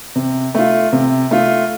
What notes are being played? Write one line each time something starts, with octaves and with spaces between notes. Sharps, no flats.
C3
A3 F4
C3
A3 F4